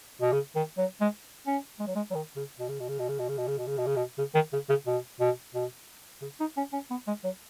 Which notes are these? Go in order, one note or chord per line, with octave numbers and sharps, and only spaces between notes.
B2
C#3
D#3
F#3
G#3
C#4
G#3
F#3
G#3
F#3
D#3
C#3
B2
C#3
B2
C#3
B2
C#3
B2
C#3
B2
C#3
B2
C#3
B2
C#3
B2
C#3
D#3
C#3
C#3
B2
B2
B2
C#3
D#4
C#4
C#4
B3
G#3
F#3